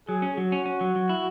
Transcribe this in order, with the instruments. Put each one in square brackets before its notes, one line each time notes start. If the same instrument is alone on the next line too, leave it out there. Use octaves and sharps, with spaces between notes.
[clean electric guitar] F#3 [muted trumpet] G#4
[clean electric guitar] C#4
[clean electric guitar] F#3 [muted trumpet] F#4
[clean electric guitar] C#4
C#4
F#3
F#3
E4